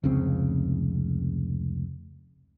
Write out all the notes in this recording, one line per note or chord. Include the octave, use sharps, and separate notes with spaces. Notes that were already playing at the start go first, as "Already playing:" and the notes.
F1 C#2 C#3 C4